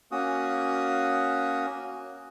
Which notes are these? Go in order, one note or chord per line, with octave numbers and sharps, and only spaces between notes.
A#3 C#4 F#4 D#6